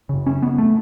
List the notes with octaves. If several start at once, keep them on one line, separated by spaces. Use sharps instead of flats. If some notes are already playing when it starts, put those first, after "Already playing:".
F#2 C#3
C#4
B3
A3